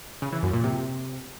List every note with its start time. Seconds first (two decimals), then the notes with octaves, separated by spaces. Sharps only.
0.22 C#3
0.32 E3
0.43 F#2
0.53 A#2
0.64 C3